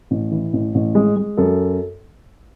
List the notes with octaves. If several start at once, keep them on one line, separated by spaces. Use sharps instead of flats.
A1
E3
A1
A1
G#3
G#3
F#2 A4